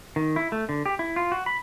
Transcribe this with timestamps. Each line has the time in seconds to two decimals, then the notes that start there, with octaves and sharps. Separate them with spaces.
0.16 D#3
0.36 E4
0.52 A3
0.69 D3
0.86 G4
0.99 E4
1.16 F4
1.32 F#4
1.46 B5